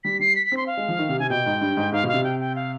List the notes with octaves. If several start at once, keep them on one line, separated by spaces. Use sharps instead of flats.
G3 B6
G3 C7
B6
B6
C4
C6
F5
G#3
F3
D#3
C3
C3 G#5
B2 G5
G#2
G2
G#2
G#2 F5
B2
F5
C3
G5
G5
F5